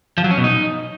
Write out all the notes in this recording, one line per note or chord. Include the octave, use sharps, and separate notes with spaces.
F3
F#3
C#4
B2
D#4